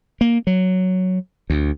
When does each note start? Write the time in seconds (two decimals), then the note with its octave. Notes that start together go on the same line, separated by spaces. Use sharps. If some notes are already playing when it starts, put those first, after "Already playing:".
0.21 A#3
0.47 F#3
1.50 D2